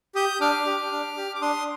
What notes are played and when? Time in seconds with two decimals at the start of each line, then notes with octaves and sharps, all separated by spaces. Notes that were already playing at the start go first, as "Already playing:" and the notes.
0.15 G4 D#6 G6
0.40 D4 D6 F6
0.66 G4
0.92 D4
1.17 G4
1.35 D6
1.41 D4 C6 D#6